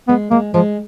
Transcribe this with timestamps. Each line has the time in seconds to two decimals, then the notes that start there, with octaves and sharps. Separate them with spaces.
0.08 G#3 B3
0.31 G#3 A#3
0.54 F3 G#3